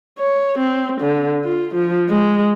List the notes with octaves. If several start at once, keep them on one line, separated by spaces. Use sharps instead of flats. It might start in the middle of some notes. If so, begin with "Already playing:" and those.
C#5
C4
D3
F4
F3
G#3